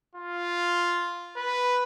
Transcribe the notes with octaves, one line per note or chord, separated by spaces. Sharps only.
F4
B4